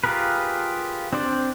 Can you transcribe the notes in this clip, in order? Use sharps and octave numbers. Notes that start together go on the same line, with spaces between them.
F4 G4 G#4 A#4 B4
C4 D4 C5 D5